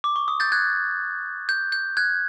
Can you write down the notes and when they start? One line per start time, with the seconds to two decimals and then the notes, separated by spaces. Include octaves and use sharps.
0.04 D6
0.16 C#6
0.28 D#6
0.40 G6 A6
0.52 F#6 G#6
1.49 G6
1.72 G6
1.97 F#6 G#6